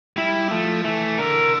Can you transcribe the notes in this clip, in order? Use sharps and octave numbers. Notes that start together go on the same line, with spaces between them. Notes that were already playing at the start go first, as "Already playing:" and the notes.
G3 E4
F3 A3
E3 A3
D3 A#4